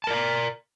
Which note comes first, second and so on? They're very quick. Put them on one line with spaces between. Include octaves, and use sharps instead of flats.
A5 A#4 D5 A#5